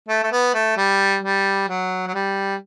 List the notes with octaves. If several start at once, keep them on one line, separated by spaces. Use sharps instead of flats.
A3
A3
B3
A3
G3
G3
F#3
F#3
G3